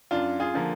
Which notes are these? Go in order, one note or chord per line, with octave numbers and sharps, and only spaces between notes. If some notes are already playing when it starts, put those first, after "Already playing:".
F#2 D4 F4
F4 G#4
D3 F3 A#3